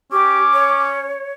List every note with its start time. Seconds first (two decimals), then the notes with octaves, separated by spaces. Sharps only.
0.12 C#4 G4 D6
0.54 C#5